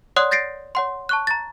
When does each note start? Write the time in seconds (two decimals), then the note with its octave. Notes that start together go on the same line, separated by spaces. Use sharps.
0.16 C#5 D5 F#5 C6 D#6 F#6
0.31 G6 A6 A#6 C7 D7
0.75 C#5 F#5 C6
1.09 A5 C#6 F#6
1.27 A#5 A6